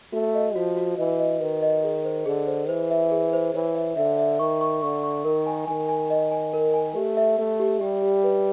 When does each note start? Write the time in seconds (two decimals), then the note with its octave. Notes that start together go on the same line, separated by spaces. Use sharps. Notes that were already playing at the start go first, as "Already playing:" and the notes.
0.13 A3 F#4
0.35 D#5
0.56 F3 F#4
0.77 F#4
0.98 E3 D#5
1.19 D#5
1.41 D#3 B4
1.62 D#5
1.84 G#4
2.05 C5
2.26 D3 G#4
2.48 C5
2.69 E3 C5
2.91 E5
3.12 G#4
3.33 C5
3.54 E3 C#5
3.75 E5
3.97 D3 E5
4.18 E5
4.39 D#3 C#6
4.61 C#6
4.82 D3 C#6
5.03 C#6
5.24 D#3 A#4
5.46 G#5
5.67 D#3 G#5
5.89 G#5
6.10 D#5
6.31 G#5
6.53 A#4
6.74 G#5
6.96 A3 G4
7.17 E5
7.39 A3 E5
7.60 G4
7.81 G3 G4
8.02 G4
8.24 B4